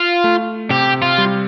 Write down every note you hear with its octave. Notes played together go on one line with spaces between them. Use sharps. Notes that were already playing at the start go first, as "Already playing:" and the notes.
Already playing: F4
A3
C3 G4
F4
G3